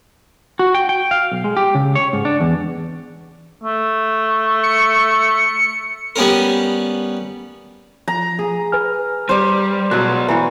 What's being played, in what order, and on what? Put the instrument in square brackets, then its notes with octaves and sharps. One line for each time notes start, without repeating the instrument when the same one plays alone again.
[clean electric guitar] F#4
G5
G5
F5
B1
G#3
G4
C#3
C#5
G#2
D4
E2
[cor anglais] A3
[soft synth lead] C#7
[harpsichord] G3 B3 C#4 A#4
[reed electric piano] F3 [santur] A#5
[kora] G#4
[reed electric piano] B4 G#5 F6
[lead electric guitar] G3 [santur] C5 D5
[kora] B2 F#3 [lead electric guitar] G#3 C#4 [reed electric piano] F#6
[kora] E3 F#4 [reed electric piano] A#5